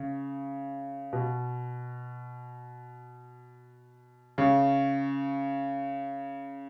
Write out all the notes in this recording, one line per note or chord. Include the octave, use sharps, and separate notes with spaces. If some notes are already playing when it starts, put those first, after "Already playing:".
Already playing: C#3
B2
C#3